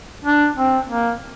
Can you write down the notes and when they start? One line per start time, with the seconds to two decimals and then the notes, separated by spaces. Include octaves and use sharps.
0.24 D4
0.56 C4
0.89 A#3